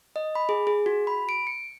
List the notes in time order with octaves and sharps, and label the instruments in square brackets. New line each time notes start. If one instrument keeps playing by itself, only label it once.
[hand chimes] D#5
B5
G#4
G#4
F#4
B5
D7
C#7